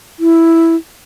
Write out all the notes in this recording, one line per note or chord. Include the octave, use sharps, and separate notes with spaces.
E4